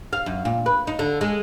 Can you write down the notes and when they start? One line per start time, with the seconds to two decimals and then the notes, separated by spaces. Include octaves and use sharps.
0.13 F5
0.26 F#2
0.45 A#2
0.66 B4
0.87 D#4
0.99 D3
1.21 G#3